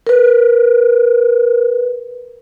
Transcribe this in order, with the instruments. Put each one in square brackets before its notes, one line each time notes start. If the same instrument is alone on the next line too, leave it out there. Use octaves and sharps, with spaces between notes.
[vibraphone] A#4 B4